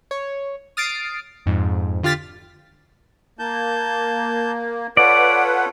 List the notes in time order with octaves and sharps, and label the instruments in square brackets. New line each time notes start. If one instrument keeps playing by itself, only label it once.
[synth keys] C#5
D#6 F6 A6 C7 D7
F2 G#2
D3 F4 G4 F6 A6 B6
[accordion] A#3 [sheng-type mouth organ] A5 G6
[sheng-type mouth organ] F4 A4 C#5 [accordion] B4 F#5 [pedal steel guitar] D5